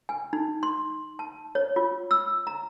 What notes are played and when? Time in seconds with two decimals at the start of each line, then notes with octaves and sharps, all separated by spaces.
0.09 G#5
0.33 D#4
0.63 C6
1.19 A5
1.55 C#5
1.76 F4
2.11 E6
2.47 A#5